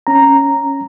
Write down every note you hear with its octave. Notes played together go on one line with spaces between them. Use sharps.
C#4 A#5